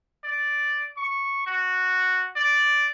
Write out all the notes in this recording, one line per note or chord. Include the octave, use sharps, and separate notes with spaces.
D5
C#6
F#4
D5